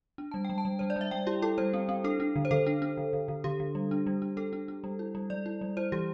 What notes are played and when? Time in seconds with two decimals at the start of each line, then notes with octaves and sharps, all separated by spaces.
0.18 D4
0.31 G3 A5
0.45 G3 G5
0.58 A5
0.65 G3
0.79 G3 C5
0.90 D5
0.96 G3 E5
1.11 G3 G5
1.27 E4 G4
1.42 E4 A4
1.58 G3 C5
1.73 C4
1.89 C4
2.04 D4 A4
2.20 D4
2.36 D3
2.45 C5
2.51 D3 A4
2.67 D4
2.82 D4
2.97 D3
3.13 D3
3.28 D3
3.44 D3 G4
3.60 D3
3.75 G3
3.91 D4
4.07 G3
4.22 D4
4.37 D4 A4
4.53 D4
4.68 D4
4.84 G3
4.99 E4
5.15 G3
5.30 G3 D5
5.46 E4
5.61 G3
5.77 E4 C5
5.92 E3 G4